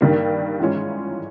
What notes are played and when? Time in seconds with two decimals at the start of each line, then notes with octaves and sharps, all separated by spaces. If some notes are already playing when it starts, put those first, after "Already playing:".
0.01 G2 D#3 G3 A#3
0.60 G#2 E3 G#3 C#4 F4